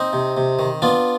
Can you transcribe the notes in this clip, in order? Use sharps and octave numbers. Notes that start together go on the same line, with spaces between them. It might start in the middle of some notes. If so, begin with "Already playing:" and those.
Already playing: C4 D#4
C3
C3
D#3
B3 D4 F4